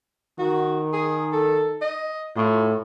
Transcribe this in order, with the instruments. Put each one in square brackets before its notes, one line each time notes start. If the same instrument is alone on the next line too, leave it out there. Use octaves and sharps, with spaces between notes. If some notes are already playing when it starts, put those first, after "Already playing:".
[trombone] D#3 [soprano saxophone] F#4
[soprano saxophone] G#4
A4
D#5
[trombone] A2 [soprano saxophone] F4